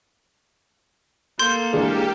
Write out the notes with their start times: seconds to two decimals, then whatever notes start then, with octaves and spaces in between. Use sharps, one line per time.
1.39 A#3 A4 C6 G6
1.73 E3 G#3 D4 G4